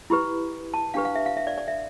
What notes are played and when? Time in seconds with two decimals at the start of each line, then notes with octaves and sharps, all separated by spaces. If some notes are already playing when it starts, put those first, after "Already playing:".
0.10 E4 G4 B4 B5
0.74 A5
0.94 D4 G4 B4 F5
1.05 F5
1.15 E5
1.26 F5
1.37 E5
1.47 D5
1.58 D5
1.68 E5